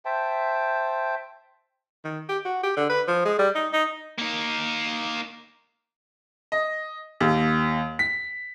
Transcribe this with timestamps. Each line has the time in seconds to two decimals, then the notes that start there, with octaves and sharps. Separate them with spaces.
0.05 C5 E5 G5 A5
2.04 D#3
2.29 G4
2.45 F#4
2.63 G4
2.77 D3
2.89 B4
3.08 F3
3.25 G#3
3.39 G3
3.55 D#4
3.73 D#4
4.19 A#3 D#4
6.52 D#5
7.20 D#2
7.99 B6